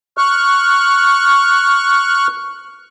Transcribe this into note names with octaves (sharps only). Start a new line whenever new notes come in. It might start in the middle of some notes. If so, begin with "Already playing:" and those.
C#6 F6 F#6